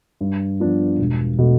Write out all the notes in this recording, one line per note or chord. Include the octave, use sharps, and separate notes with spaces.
G2
F3 B3 D4 F4
E1
B2 A3